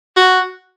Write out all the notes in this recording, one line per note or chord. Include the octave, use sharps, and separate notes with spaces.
F#4